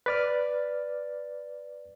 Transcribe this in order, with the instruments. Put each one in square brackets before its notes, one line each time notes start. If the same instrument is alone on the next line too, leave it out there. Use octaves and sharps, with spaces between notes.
[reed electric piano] B4 D5 F6